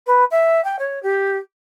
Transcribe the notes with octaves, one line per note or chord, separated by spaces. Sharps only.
B4
E5
G5
C#5
G4